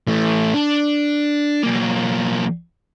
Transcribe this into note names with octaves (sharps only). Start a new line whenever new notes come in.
E3 A3
D4
B1 A#3